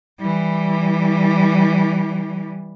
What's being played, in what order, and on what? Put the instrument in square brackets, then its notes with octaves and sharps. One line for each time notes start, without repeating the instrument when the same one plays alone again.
[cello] E3 G3